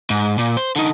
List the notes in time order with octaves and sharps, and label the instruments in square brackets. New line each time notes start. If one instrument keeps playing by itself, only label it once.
[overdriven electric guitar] G#2
A#2
C5
D3 D#4